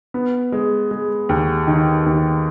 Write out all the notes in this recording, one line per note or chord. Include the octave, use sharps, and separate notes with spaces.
B3
G#3
G#3
D#2
D#3
D#2